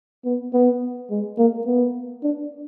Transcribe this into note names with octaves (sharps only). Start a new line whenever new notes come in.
B3
B3
G#3
A#3
B3
D4